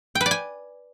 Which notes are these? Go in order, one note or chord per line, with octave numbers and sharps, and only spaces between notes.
G5
B4
D5
G#5